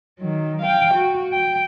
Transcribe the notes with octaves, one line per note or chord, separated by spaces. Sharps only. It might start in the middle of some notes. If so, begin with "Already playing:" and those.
D#3 F#3
F5 G5
F#4
G5